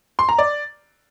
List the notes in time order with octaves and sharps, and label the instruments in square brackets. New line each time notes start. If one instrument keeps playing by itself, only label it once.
[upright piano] C6
A#5
D5